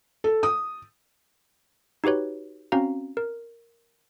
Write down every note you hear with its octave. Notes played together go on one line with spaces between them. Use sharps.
A4
D#6
D#4 F#4 G4 B4 C#5
C4 C#4 F#4 F5 A#5
A#4